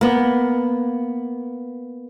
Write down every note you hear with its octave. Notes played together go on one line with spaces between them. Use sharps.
A#3 B3